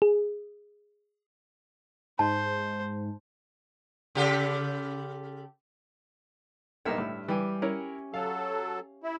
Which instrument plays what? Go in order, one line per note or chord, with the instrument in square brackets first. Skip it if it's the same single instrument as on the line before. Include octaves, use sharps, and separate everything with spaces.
[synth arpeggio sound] G#4
[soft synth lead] G#2 [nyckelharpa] C5 [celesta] A5
[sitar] C#3 G4 A4
[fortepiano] B1 A#3 D#4 [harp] G2 E5 F6
[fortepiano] A2
[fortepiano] E3 [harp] G3 G4 G#5
[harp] C#4 [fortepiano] E4 A#4 C#5
[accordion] F#3 A4 [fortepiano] F5
[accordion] E4